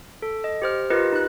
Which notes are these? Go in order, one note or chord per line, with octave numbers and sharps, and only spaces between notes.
A4
D#5
G4 C5 F6
F4 G4 A#4 B4 D#5
D#4 F#6